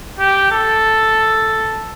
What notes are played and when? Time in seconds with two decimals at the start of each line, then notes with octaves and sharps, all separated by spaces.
0.19 G4
0.52 A4